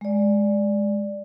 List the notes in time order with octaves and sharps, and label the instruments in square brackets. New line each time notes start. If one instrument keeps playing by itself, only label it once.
[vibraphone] G#3 D5